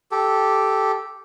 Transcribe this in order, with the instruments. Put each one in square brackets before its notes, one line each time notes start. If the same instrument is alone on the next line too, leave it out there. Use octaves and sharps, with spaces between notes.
[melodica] G4 A4